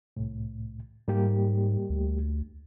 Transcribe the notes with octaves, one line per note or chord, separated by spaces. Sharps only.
C2 A2
G#2 G3 A#3 G4
D2